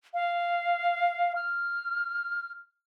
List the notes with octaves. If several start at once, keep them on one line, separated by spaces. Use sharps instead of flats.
F5
F6